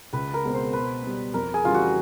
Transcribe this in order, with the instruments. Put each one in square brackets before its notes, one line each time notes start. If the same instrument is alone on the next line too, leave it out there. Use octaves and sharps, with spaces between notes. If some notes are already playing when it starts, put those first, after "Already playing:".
[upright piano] C#2 [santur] B4
[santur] A#4
[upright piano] B2 G#3 C4
[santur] C5
[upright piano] B2 [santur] B4
[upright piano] G3 B3
[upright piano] F2 [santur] A#4
[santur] G#4
[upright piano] C#3 E3 G3 [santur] F4
[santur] F#4